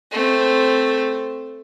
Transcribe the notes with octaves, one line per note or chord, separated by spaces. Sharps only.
A3 C4